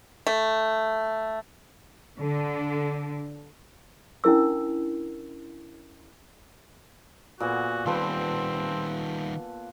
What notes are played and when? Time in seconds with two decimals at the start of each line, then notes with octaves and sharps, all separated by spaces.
0.27 A3
2.19 D3
4.24 C#4 D4 E4 A#4 E6
7.40 A#2 B3 F#4 G#5
7.86 D#3 G3 C4 F4 A4 B4